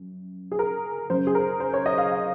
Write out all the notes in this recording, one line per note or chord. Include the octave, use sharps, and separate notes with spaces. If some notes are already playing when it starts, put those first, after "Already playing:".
Already playing: F#2
G#4
A#4
F#2 C#3 C5
G#4
A#4
C5
C#5
D#5
F5
F5